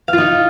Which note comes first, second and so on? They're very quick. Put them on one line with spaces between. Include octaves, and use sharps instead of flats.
F5 F4 D#4